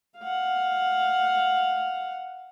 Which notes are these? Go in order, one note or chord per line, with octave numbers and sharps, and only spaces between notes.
F5 F#5